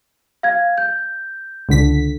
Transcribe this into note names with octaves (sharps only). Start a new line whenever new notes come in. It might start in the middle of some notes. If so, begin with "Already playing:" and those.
F5 G#6
G6
C#2 D3 B6